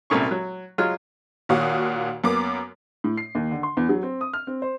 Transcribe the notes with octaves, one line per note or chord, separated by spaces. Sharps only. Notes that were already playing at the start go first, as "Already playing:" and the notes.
C2 F#2 A#2 A3 C#6
F#3
F#3 G#3 F4 F6
D#2 A#2 F#4 C#5 F5 D#6
F#2 A#3 B3 D6
A2
C7
D#2
D3
C6
E2
F#3
C4
D#6
F6
C4
C5